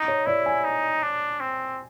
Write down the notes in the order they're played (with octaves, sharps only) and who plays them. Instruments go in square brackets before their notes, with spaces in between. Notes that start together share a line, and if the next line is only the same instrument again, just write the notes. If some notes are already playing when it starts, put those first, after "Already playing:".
Already playing: [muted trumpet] D#4
[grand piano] C#5
[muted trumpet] E4 [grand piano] D5
[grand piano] G#5
[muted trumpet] D#4
D4
C4